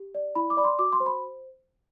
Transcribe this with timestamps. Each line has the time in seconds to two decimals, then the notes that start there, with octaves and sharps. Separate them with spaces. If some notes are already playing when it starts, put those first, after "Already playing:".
Already playing: G4
0.15 D5
0.35 E4 B5
0.50 D6
0.57 D5 B5
0.64 C6
0.79 F#4 D6
0.93 C6
1.00 C5
1.06 B5